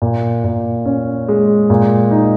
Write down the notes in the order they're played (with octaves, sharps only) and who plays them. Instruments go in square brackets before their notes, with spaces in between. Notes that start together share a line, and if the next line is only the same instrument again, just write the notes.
[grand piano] A#2
A#2
C#4
G#3
A#2
D#4